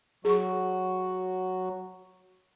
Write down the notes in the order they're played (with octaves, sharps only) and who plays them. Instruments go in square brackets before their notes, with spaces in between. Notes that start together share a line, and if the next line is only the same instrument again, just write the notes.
[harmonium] F#3 F#4 [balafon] G#4 C#6